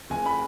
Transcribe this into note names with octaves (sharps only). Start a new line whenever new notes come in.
F#1 G#5
B5